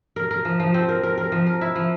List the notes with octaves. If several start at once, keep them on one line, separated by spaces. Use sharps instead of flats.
A#4
A#4
F3
F3
C4
A#4
A#4
A#4
F3
A#4
E4
F3